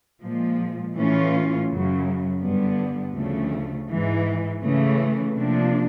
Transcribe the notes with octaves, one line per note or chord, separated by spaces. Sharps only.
A#2 F3 G#3
A2 E3 A3 C#4 F4
F#2 C#3 F#3
G2 D3 G3 B3
D2 C#3 F3 A3
G#2 E3 G#3
C#3 E3 A3
C3 F3 A#3 D4